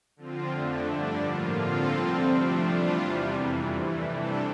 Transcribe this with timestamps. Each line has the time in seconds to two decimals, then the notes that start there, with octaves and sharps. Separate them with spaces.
0.16 D3 F3 C4 F4
0.52 F2 D3 A3 D4
0.87 G2 D3 G3 D4
1.22 A2 F3 A#3 F4
1.58 D3 F3 C4 F4 A4
1.93 C3 G3 C4
2.28 F3 A3 D4
2.64 E3 G3 D4 F4
2.99 E2 C3 G3
3.34 F2 C3 E3
3.69 G2 E3 A3
4.05 C3 G3 D4 A4